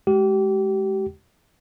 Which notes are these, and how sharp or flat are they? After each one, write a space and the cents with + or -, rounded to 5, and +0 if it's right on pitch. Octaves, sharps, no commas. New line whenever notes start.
G#3 +25 G4 -30